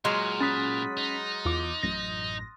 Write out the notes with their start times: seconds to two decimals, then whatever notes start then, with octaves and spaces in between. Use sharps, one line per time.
0.05 A#2 F#3 G#3 C6 F6 D#7
0.41 C#4 B5 D#6 F#6 A6 B6
0.97 D#4
1.45 E2 F4 D6
1.83 A1 F#2 A#6